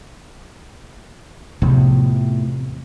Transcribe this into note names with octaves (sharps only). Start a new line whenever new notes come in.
E2 A2 C3 F3 B3